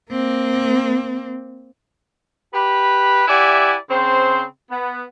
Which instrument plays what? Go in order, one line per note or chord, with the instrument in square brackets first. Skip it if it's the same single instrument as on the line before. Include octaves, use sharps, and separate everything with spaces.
[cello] A#3 C4
[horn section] G4 B4 B5
E4 G4 D5 E5 F#5 G#5
C#3 C4 C5
B3